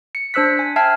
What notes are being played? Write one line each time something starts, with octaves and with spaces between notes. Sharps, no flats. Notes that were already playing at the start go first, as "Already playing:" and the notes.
C#7
D4 C5 E6 F#6 B6
G#5
E5 G5 A5 F6 G#6 C7